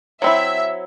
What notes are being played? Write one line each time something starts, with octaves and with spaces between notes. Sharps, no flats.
F#3 C4 E4 E5